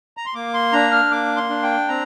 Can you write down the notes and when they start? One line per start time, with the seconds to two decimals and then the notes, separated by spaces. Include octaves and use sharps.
0.17 A#5
0.26 C6
0.35 A#3 D6
0.54 C6
0.72 D4 A#5
0.92 F6
1.11 A#3 D6
1.37 C6
1.49 D4
1.63 G5
1.88 C4 A#5